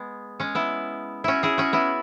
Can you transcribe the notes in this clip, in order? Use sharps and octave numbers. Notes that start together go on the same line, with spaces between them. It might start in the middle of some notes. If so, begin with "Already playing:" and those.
Already playing: G#3 B3
G#3 C#4
B3 E4
C#4 E4 F#4
E4 G#4
C#4 F#4
B3 E4